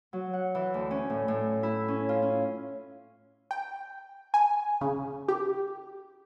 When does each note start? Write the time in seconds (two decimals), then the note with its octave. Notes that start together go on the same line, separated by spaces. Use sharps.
0.13 F#3
0.33 F#5
0.55 E3
0.74 D2
0.91 C#4
1.10 A2
1.28 A2
1.63 E4
1.88 C#4
2.09 F4
2.22 C#4
3.51 G5
4.34 G#5
4.81 C#3
5.28 G4